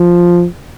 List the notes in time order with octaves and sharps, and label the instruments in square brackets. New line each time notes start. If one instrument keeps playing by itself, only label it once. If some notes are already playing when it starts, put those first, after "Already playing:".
Already playing: [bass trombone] F3